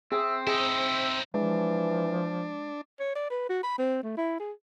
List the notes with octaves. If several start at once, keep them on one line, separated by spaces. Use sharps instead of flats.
C4 G#4 E5
D#4 E4 G#4 E5
E3 F3 G#3 D4
C#5
D5
B4
F#4
B5
C4
A3
E4
G#4